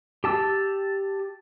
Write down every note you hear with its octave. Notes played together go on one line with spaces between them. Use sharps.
G4 A5 E6